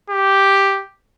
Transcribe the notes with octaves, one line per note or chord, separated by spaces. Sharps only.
G4